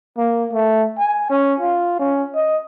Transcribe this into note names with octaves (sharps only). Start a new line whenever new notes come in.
A#3
A3
G#5
C#4
F4
C#4
D#5